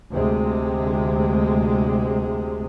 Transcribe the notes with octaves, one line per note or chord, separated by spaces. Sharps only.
D2 C3 G#3